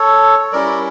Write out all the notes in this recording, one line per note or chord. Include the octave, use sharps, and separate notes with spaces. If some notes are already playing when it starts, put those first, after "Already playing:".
Already playing: A4 C#5
G3 C#4 E4 A#4 D5